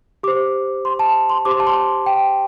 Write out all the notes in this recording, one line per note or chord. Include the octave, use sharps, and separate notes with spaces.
G4 C5 D6
C6
A5
C6
G4 C5 D6
C6
A5
C6
G5